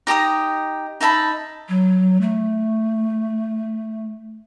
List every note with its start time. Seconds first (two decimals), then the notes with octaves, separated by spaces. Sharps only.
0.07 D#4 G4 A#5 D#6
1.01 D#4 E5 A5 B5
1.69 F#3
2.22 A3